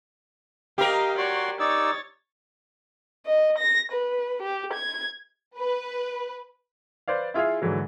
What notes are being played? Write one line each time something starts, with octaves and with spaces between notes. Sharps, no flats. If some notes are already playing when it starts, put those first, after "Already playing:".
G4 A#4 D#5 F5
F#4 C#5 D5 C6
D#4 C#5 D5 E6 A6
D#5
A#6
B4
G4
G#6
B4
B4 C5 D5 F5
E4 F4 G#4 E5 F5
G#2 D3 E3 F#3